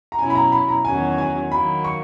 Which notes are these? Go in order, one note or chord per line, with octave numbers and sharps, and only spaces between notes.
A#5
B2 F#3 C#4 E4 G#5
B5
A#5
B5
A#5
E2 D#3 F#3 C#4 F#4 G#5
G#5
D#3 F#3 A#3 B5
C#6